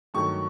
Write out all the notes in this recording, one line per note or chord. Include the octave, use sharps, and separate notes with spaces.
G2 D#3 F#3 A3 C#6